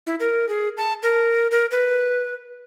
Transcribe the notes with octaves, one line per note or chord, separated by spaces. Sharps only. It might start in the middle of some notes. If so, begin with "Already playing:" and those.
E4
A#4
G#4
A5
A#4
A#4
B4